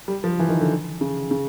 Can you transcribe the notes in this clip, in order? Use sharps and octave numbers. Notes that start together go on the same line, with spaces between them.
G3
F3
E3
D#3
D3
C#3
C#3